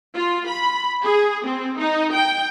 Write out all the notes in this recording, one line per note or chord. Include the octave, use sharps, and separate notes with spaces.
F4
B5
G#4
C4
D#4
G5